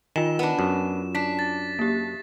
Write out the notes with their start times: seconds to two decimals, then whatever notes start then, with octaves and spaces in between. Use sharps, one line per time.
0.16 D#3 F4 G#5 E7
0.39 B3 D4
0.59 F#2
1.15 D4 B6
1.39 A6
1.79 A#3 G4